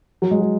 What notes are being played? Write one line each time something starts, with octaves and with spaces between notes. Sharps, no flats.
F#3
G#3
F#3